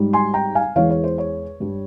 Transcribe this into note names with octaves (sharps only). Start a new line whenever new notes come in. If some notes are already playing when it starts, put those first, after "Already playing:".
Already playing: G#2 G3
G#5 C6
G5 A#5
F5 G#5
E2 E3 G#3 C#5 F5
C#5
C5
C#5
G2 G3